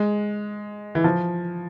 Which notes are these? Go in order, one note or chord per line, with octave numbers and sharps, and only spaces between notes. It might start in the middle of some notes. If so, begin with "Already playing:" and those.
Already playing: G#3
E3
F3